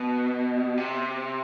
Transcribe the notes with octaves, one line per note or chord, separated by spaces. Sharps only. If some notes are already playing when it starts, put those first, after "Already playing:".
Already playing: B2
C3